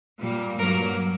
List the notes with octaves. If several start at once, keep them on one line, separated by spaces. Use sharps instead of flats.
A#2 G3 A#3
G2 F#3 A#3 A#4